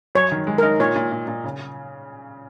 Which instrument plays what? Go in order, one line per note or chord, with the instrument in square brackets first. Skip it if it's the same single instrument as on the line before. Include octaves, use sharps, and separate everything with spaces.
[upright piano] F#2 [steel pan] C#5
[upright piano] D#3
G#3
[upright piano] D#4 [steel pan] A#4
[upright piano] A#2 [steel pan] C#5
[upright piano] A#2
A#2
A#2
C#3